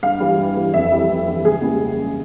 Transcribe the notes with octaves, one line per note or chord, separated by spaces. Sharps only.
G2 F5
E3 G3
G2
E3 G3
F2 E5
E3 G3
F2
E3 G3
C#2 G#4
C#3 G3 A#3